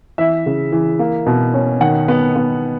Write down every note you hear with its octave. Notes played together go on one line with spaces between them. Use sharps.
E3 E5
C#3
E3
A#3
B2
C#4
D#3 F#5
B3
B3